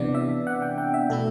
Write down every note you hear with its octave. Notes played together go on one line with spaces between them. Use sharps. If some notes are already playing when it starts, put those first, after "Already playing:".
Already playing: C3 E3 B3 D4 D5
E5
F#5
G5
G5
E5
B2 A3 E4 A4